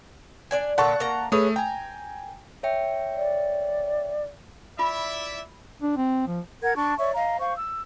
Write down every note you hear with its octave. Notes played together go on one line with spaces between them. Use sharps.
D4 D5 G#5
A#2 D3 A4 F#5 A5 C#6
A#3 A#5
A3 G#4 B4 C#5 D#6
G5 G#5 A#5
C#5 E5 G5
D5
E4 F4 D5 E5 B5
D4
C4
F3
A#4 F#5 G#6
D4 A5 C#6
C#5 D5 E5 C#6
D#5 F5 A#5
C5 F5 C#6
E6